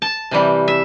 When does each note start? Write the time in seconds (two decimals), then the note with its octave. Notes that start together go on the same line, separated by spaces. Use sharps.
0.02 A5
0.31 C3 E3 G3
0.68 E5